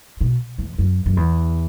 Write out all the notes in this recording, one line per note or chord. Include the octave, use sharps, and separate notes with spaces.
B2
E2
F#2
F#2
E2